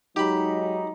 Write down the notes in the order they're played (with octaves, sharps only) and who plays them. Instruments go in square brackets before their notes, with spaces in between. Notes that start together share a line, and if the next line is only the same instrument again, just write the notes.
[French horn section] F#3 G#3 D#4 [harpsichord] G4 B5